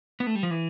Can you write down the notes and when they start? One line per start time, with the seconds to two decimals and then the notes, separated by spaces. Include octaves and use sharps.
0.20 B3
0.27 A3
0.35 G3
0.43 F3
0.51 E3